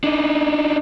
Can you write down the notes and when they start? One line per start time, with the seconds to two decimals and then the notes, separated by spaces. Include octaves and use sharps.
0.04 D4 D#4